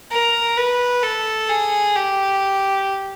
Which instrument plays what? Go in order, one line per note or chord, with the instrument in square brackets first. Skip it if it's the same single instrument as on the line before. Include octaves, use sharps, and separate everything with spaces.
[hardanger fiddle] A#4
B4
A4
G#4
G4